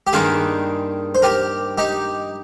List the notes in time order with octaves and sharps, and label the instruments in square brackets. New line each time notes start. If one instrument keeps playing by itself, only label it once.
[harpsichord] G4
[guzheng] G2 D#3 G3 A#3 [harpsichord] F4 G#4
[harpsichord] C5
G4 A#4
D#4 G4